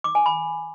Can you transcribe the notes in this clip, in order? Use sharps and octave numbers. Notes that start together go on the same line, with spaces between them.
D6
G#5
B5